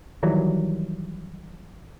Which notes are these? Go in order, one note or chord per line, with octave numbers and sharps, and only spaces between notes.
D#3 E3 F#3 G3